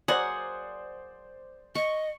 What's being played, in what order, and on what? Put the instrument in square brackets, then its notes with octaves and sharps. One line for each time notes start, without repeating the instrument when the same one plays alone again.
[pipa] F#3 A#3 G#4 [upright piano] C5 D5 [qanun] F#5
[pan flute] D#5 [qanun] C#6